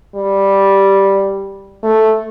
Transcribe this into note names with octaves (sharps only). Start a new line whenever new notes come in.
G3
A3